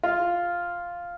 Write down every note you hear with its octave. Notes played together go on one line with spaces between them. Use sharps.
F4